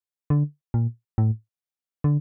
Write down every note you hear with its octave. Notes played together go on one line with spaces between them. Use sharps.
D3
A#2
A2
D3